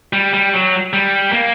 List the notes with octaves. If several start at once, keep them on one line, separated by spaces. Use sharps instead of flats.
G3
G3
F#3
G3
A#3